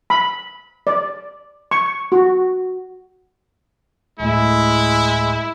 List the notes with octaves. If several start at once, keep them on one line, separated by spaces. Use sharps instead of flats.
B5
D5
C#6
F#4
D1 A2 G#3 E4